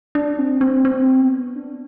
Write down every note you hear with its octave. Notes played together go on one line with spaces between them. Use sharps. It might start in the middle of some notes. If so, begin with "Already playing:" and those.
D4
C4
C4
C4
B3
D4